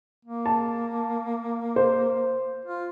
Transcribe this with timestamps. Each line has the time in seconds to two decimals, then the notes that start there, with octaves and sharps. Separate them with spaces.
0.25 A#3
0.46 A5
1.76 C5
2.65 F4